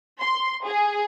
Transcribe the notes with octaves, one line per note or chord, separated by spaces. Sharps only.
C6
G#4